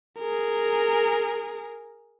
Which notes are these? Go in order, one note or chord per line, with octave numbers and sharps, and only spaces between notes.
G#4 A#4